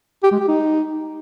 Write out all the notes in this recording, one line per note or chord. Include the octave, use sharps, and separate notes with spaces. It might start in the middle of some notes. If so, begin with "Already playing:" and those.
G4
G#3
G4
D#4